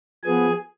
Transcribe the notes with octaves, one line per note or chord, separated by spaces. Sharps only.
F3 B3 G#4 G#5